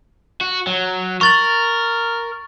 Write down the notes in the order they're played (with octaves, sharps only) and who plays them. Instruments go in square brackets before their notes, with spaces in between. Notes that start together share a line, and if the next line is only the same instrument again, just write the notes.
[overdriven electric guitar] F#4
F#3
[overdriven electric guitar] A#4 [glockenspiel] C#6 A6 F#7